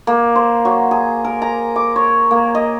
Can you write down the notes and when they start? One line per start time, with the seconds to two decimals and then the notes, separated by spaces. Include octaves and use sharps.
0.07 A#3
0.36 C5
0.65 F#3
0.91 G#4
1.25 A#4
1.42 A#5
1.76 D6
1.96 C#5
2.31 A#3
2.55 D#5